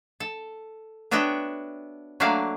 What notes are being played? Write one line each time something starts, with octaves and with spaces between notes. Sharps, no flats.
A4
B3 D4 F#4 C#5 E5 G5
F#3 A3 A#3 D4 F5